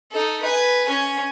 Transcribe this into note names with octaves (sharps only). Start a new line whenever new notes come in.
D#4 A4
B4 G#5
C#4 G#5